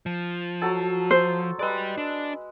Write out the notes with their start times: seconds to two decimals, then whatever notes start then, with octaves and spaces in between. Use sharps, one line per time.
0.06 F3
0.61 F#3 A4 A5
1.11 C5
1.59 G#3 G4 B4 D5 E6
1.97 D4